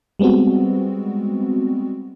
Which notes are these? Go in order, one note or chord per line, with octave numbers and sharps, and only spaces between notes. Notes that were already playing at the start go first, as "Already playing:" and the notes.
G3 G#3 B3 C4 F#4